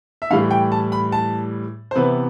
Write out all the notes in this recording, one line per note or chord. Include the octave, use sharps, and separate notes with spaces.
E5
A2 E3 G3 F5
G5
A5
B5
A5
C5
C3 E3 B3 B4